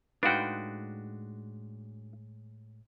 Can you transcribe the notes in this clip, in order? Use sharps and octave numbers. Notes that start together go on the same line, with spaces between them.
A2 G#3 D4 D#4 F#4 B4 F5 G5